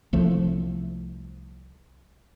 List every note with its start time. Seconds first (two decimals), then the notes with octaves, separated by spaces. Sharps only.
0.13 C2 F3 A3